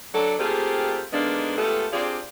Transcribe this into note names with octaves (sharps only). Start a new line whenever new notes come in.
F#3 D4 A4
A3 A#3 C4 F4 G4 G#4
D3 D#3 G#3 A#3 B3 D4
G#3 A3 B3 F4 G4 A4
C4 D4 F4 G4 G#4 D5